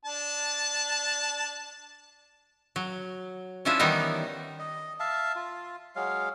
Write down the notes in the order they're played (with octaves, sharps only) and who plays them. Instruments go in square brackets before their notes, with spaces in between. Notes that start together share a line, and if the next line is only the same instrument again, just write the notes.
[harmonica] D4 A5
[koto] F#3
C#4 D4 E4 F4 B4 E5
D#3 E3 G3 B3 D#4
[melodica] D#5
E5 F5 A5
F4
F#3 G#3 F5